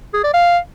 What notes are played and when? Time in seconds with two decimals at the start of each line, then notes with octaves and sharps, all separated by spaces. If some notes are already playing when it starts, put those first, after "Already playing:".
0.14 G#4
0.24 D5
0.33 F5